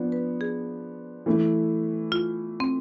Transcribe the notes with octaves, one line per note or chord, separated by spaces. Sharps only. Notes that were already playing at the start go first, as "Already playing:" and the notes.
Already playing: F3 B3 D4
B4
G#4
E3 A3 E4
F4
C4